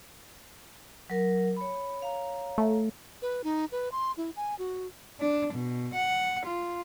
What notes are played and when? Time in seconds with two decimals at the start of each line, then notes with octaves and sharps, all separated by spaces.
1.10 F#3 A#4
1.57 C#5 B5
2.00 C#5 F5 A#5
2.58 A3
3.22 B4
3.44 D#4
3.72 B4
3.92 C6
4.17 E4
4.36 G#5
4.59 F#4
5.20 D4
5.54 B2
5.94 F#5
6.46 F4